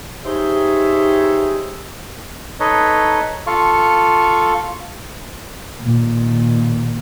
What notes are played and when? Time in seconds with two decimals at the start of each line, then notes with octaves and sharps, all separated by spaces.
0.25 D#4 G4 G#4 C5 C#5 E5
2.60 D#4 A4 B4 C#5 D#5
3.47 F4 A4 F5 C#6
5.81 A#2 D#3